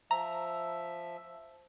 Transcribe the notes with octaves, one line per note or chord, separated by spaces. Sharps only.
F3 E5 A#5